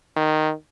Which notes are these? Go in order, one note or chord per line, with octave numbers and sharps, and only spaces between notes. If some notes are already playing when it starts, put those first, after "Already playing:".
D#3